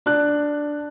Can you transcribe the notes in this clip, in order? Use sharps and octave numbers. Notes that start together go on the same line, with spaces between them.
D4 F#6